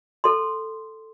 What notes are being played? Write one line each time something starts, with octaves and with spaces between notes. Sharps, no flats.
A4 C6